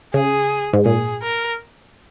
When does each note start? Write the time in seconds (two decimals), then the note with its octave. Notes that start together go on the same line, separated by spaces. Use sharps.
0.14 C#3 G#4
0.73 G#2
0.85 A#2 G#4
1.22 A#4